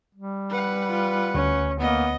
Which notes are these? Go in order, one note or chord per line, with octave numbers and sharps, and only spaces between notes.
G3
B4 F#5
F4
D2 C#4
A#3 B3 D#5